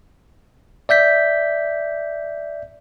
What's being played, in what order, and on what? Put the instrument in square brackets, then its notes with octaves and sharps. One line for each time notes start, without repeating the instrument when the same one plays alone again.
[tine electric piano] D5 E5 G6 B6